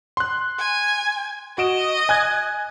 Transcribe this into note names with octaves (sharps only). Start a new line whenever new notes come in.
C6 F#6
G#5
F#4 D#5 D7 E7
G#5 F#6 G#6